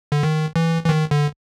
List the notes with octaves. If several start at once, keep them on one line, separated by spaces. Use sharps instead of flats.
D3
D#3
E3
E3
D#3
D3